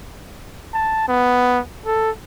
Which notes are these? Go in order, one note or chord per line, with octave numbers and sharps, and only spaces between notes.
A5
B3
A4